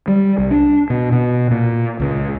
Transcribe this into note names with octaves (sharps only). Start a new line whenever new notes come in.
G3
C2
D4
B2
B2
A#2
C#2